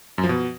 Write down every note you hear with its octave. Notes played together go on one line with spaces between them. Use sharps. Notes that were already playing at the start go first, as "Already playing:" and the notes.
F#2
F3
B2